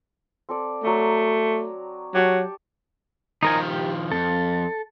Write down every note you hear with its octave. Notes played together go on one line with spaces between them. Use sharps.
C4 A4 D5
F#3 A3 A#5
F#3 G4 A5 C#6
D#3 F3 D#4 A#4 G#5
G4
F2 A4